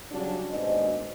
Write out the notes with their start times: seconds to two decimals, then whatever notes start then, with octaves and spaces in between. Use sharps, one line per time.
0.11 C#3 F#3 G3 C#4 D4
0.50 D#2 G#2 B2 D4 C5 D#5